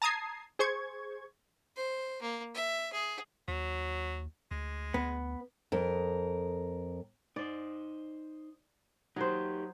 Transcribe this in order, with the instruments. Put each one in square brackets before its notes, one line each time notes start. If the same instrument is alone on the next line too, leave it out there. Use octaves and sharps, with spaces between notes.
[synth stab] A5 A#5 D#6 G#6 C7
G#4 C5 C#6 G#6
[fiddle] C5
A#3
E5
G#4
[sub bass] D#2 [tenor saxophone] F#3
[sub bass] D2 [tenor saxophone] G#3
[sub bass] D2 [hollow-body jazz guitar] B3
[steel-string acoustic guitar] F2 A#4
[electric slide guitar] D#4 C5 [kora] D5
[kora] F#3 C5 [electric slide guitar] D#4 G4